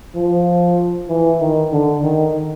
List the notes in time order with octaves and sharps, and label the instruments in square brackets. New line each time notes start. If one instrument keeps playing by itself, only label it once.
[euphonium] F3
E3
D#3
D3
D#3